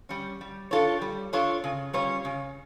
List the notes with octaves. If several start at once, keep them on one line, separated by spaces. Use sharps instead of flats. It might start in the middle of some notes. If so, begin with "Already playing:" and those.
G3 C#4
G3
D4 F4 A4 C#5
G3
D4 F4 A4 C#5
C#3
G3 C#4 F4 C#5
C#3